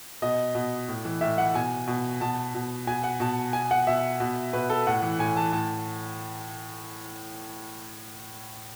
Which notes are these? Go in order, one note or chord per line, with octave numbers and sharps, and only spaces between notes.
B2 D#5
B2
A2
E3
A2 E5
E3 F#5
B2 G#5
B2
B2 A5
B2
B2 G#5
F#5
B2 A5
B2 G#5
F#5
B2 E5
B2
B2 B4
A4
A2 F#5
E3
A2 G#5
E3 A5
A2 A5